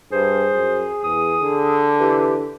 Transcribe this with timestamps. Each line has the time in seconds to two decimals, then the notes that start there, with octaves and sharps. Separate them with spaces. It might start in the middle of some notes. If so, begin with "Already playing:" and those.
0.12 G2 G#4 C5
0.55 F#2
1.03 E2 D#6
1.41 D3
2.00 E3 G4